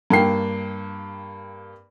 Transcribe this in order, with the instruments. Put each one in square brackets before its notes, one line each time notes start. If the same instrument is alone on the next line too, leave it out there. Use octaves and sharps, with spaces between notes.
[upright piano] G2 A#3 G5 C7